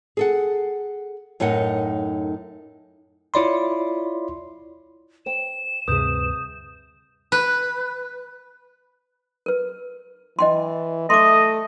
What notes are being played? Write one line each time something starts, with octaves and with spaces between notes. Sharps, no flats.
G#4 A4 F#5
F#2 A2 D#4 A#4 F#5
E4 F4 C#5 D5 B5 C6
C5 G5 E7
D2 G2 C3 G#4 B4 D#6 G6
B4
A#4 B4
E3 D#5 G5 C6
A3 D#5 C6 D6